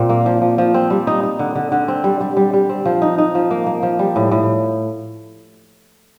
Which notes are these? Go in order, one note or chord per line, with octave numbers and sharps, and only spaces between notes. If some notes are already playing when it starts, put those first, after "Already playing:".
Already playing: A#2 C4
A#3
F3
F3
F3
C4
G3
D#4
D#4
D3
D3
D3
C4
G3
G3
G3
G3
C4
F3
D#4
D#4
F3
A#3
A#3
F3
G3
A2
A2